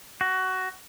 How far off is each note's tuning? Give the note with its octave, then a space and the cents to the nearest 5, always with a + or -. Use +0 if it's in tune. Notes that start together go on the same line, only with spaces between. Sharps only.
F#4 +15